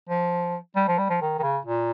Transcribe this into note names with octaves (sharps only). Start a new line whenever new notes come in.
F3
G3
F3
G3
F3
D#3
D#3
C#3
A#2